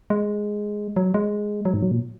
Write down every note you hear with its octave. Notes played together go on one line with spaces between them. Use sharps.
G#3
F#3
G#3
F#3
G#2
F#3
A#2